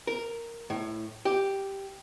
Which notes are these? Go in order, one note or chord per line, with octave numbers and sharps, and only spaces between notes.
A#4
A2
G4